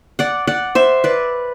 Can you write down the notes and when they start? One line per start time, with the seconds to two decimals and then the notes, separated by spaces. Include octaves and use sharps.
0.19 D5 F#5
0.47 D5 F#5
0.75 C5 E5
1.04 B4 D5